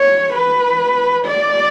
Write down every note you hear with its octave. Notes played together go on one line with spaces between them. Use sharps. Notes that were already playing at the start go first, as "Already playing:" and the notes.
Already playing: C#5
B4
D5